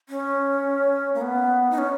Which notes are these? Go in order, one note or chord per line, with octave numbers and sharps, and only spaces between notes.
C#4
A#3
B3
D#4
C#4